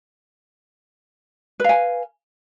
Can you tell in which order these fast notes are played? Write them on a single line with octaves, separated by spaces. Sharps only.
B4 F5 G#5